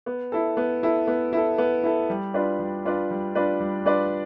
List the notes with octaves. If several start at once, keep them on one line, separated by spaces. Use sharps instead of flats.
B3
E4 A4
B3
E4 A4
B3
E4 A4
B3
E4 A4
G3
D4 F4 B4 D5
G3
D4 F4 B4 D5
G3
D4 F4 B4 D5
G3
D4 F4 B4 D5